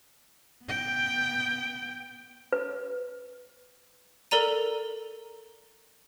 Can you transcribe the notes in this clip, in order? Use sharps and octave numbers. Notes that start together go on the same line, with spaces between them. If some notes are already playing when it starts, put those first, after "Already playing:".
B3 G5
B4
A4 A#4 D5 A#5 D#7